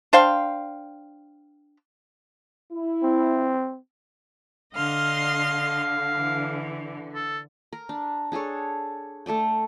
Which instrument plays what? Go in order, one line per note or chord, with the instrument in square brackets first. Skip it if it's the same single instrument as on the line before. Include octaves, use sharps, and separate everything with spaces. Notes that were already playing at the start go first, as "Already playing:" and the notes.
[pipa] D4 C5 F5 G5
[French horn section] E4
[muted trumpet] C4
[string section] D3 [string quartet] D#5 C6 F6 [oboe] F5
[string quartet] E3
[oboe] A4
[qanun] A#4
D4
D4 G#4 A4 C#5
A3 A4 D5 G5